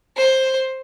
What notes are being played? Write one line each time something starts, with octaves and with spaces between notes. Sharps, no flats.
C5